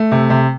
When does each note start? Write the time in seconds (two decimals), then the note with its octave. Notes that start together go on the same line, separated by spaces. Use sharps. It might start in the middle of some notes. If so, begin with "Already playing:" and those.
Already playing: A3
0.12 C3
0.30 C3